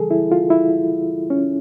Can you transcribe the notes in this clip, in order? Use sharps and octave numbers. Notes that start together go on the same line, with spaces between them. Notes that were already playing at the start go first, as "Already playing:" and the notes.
Already playing: C#3 E3 G3 G#4 A4
E4
F4
E4
C#4